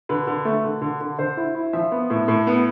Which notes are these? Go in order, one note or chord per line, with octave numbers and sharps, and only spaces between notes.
D3 B4
D3
A3
D3
D3
D3
D3 C5
E4
E4
F3 E5
B3
A2
A2
B3